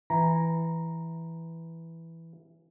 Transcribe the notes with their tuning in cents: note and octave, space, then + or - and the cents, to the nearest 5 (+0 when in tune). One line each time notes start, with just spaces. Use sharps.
E3 +0 A#5 +0